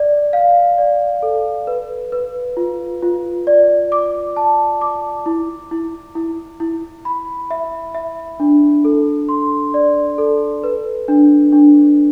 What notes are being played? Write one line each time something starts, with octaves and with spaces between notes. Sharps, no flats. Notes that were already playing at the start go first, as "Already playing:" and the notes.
Already playing: D5
F5
D5
A4
B4
B4
F4
F4
D5
D6
A5
D6
E4
E4
E4
E4
B5
E5
E5
D4
A4
C6
D5
A4
B4
D4
D4